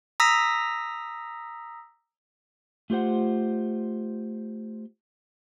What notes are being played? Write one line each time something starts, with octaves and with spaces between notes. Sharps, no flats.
A#5 D#6 E6 A#6 B6
A3 F4 G4 C5 F#5